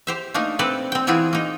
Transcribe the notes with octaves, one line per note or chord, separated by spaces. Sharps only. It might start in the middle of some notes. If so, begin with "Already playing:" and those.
G4 C5 E5
A3 A#3 D4 D#4
C4 A4 B4 D5
C4 G5
E3 B3 C4 E4 F4 G#4
A#3 D#4